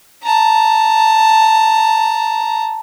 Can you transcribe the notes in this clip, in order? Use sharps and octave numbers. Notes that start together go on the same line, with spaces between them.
A5 A#5